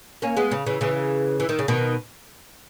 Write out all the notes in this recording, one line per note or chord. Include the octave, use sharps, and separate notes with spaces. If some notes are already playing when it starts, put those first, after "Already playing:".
A#3 C#4
G#3 B3
C#3
C#3 E3
C#3 E3
E3
D#3
C#3
B2 D#3